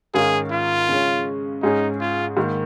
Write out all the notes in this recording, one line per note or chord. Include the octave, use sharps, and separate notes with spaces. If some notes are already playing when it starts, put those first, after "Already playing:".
G#2 D#3 C#4 G#4 A#4 F5
F4
C#3 G#3 C#4
G#2 G#3 C#4 D#4 G#4
F4
G#2 D#3 A#3